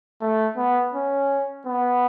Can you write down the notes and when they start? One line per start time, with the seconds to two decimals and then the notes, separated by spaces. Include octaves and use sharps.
0.21 A3
0.57 B3
0.94 C#4
1.67 B3